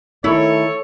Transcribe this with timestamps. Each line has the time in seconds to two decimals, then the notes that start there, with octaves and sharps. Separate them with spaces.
0.24 D#3 A3 E4 A4 C#5